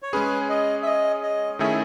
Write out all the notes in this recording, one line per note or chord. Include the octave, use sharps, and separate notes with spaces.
C#5
G#3 C#4 G#4 B4
D#5
E5
D#5
D#5
D#3 A3 C#4 E4 G#4 E5